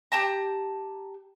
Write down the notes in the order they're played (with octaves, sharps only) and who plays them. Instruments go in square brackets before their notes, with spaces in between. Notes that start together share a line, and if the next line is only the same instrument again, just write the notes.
[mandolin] G4 A5 A#5